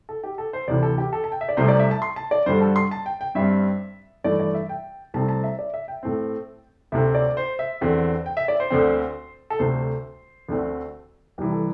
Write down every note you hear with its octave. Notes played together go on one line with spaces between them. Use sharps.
A4
G4
A4
C5
D2 C3 E3 D5
A4
G4
A4
A5
G5
E5
D5
C2 C3 A3 C5
D5
E5
A5
C6
A5
D5
G2 D3 G3 C5
A4
C6
A5
G5
G5
G2 G3 C4 E5
G2 E3 A3 D5
D5
E5
G5
C2 C3 A3 C4 A5
A5
E5
D5
E5
G5
A2 A3 C4
D2 C3 A3 C4 E5
D5
C5
E5
E2 D3 C4
G5
E5
D5
C5
D2 D3 C4
A4
D2 C3 A3 C5
D2 D3 A3 C4
C2 C3 E3 G4
A4